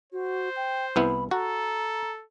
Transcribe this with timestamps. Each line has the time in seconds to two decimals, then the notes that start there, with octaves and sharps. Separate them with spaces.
0.13 F#4 C5
0.56 G5
0.96 C2 B3 E4 B5
1.31 F#4 A4 A#5